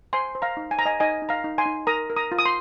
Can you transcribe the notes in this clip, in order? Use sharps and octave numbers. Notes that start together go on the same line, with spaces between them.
C5 G#5 C6
C5
F5 A#5
D#4
G#5
C5 A#5
D#5 G#5
D#4 D#5 G#5
D#4
F5 A#5
D#4
G#5 C6
D#4
A#4 A#5 D#6
A#4
A#5 D#6
F4
D#6
C6